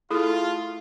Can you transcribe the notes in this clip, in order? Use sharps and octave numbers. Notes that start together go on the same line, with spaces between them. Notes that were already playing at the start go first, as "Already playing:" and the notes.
A3 E4 F4 G#4 A4